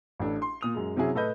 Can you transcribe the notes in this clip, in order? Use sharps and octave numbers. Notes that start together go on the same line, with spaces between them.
A1 D4 A4
C6
A#2 D#6 F7
F#2 G#3
C3 F#3 C#4 E4 G#4
A2 A4 B4 D#5 G6